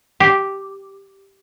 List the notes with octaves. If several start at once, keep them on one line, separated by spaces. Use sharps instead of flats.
G4